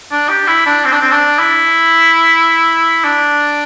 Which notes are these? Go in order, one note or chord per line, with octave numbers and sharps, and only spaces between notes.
D4
G4
E4
D4
C4
D4
C4
D4
E4
D4